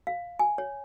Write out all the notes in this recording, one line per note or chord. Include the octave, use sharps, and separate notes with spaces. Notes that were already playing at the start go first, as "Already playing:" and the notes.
F5
G#5
C#5